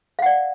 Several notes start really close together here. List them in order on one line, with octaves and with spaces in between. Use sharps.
F5 F#5 D5